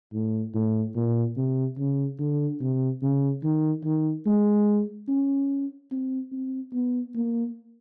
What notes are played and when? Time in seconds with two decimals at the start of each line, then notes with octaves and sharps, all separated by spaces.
0.13 A2
0.54 A2
0.96 A#2
1.37 C3
1.78 C#3
2.19 D3
2.61 C3
3.02 C#3
3.43 D#3
3.85 D#3
4.26 G#3
5.08 C#4
5.91 C4
6.32 C4
6.73 B3
7.15 A#3